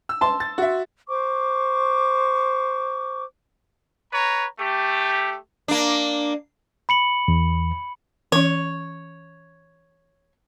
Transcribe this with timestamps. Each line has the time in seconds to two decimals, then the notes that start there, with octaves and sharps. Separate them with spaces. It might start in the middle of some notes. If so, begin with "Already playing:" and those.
0.09 E6
0.21 A5 C6
0.40 A6
0.58 F#4 E5
1.09 C5 C#6 D6
4.12 B4 C#5 A#5
4.58 A3 G4
5.68 A#3 D4
6.89 B5 C#7 F#7
7.28 E2
8.32 E3 C#4 C#5